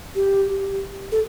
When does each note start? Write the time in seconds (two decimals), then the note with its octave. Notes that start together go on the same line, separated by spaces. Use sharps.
0.15 G4
1.12 A4